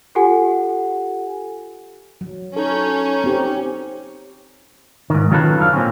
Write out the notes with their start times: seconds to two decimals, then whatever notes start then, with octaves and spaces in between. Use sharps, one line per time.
0.15 F4 G4 A4 F#5 G#5
2.21 F#3
2.56 C#4 D#4 A4
3.24 C4 G4
5.10 G#2 D#3
5.31 D#3 F#3 C#4 F4 A4 B4
5.60 F#2 D3 F5
5.73 A#2 C4 C#4